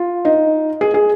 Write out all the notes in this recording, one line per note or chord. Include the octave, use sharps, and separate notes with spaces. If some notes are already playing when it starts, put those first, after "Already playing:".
Already playing: F4
D#4
G#4
G#4